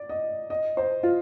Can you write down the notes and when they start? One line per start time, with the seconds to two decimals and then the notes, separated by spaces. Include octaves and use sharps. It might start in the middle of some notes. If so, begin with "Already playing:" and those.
Already playing: D5
0.09 D#5
0.50 D#5
0.77 C5
1.03 F4